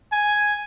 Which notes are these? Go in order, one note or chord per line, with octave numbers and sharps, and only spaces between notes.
G#5